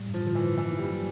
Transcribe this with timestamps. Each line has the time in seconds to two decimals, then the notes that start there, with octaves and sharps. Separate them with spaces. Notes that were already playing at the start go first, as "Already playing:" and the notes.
Already playing: A2 G3
0.08 G2
0.14 F3
0.25 D3 F3
0.35 E3
0.41 G2
0.57 E3 A#3
0.73 D#4
0.79 G3
0.89 F#3